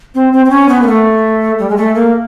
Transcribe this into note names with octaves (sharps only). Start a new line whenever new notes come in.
C4
C4
C4
C#4
B3
A#3
A3
G3
G#3
A3
A#3